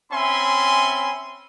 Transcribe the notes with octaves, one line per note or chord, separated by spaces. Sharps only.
C4 C#4 E5 G#5 B5 C6